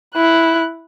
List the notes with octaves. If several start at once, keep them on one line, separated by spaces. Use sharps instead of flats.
E4 F#6